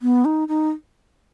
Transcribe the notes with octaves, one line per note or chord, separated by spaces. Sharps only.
B3
D#4
D#4